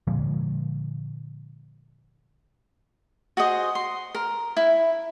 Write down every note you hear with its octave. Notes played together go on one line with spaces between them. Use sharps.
A#2 D3 F3 G#3
F#4 G#4 C5 D#5
C6
A#4
E4